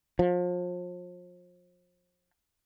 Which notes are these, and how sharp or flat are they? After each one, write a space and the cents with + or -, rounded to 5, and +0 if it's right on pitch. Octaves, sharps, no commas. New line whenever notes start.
F3 +35